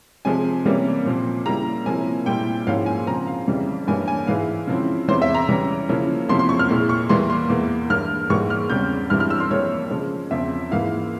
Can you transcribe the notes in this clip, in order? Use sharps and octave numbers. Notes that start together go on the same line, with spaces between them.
C3 F3 G#3 G#5
C3 E3 G3 A#3 C#4
A#2 F3 C4
C#3 G3 A#3 E4 A#5
C3 F3 A#3 C#4 E4 G#5
A#2 G3 C4 E4 G5
G#2 F3 A#3 C#4 E4 F5
G#5
C#3 F3 C4 A#5
F5
F2 C#3 E3 G3
G2 E3 G3 A#3 C#4 G#5
G#5
G#2 E3 G#3 E4 F5
C#3 F3 C4 E4
E2 C3 E3 C5
E5
A#5
C#3 E3 G3 C#4
C#3 F3 A#3 C#4 E4
E2 C3 F3 A#3 E4 C6
C6
C#6
F6
A#2 G#3 E4
C#6
E2 E3 G3 A#3 C6
C6
E2 E3 A#3
G2 E3 A#3 F6
G#2 E3 G3 A#3 C#6
F6
E2 C#3 G3 C4 G6
G2 E3 G3 C4 E4 F6
F6
E6
C6
F2 E3 G3 A#3 C#5
C#3 F3 G#3
E2 C#3 F3 C4 E5
G#2 E3 A#3 E4 F5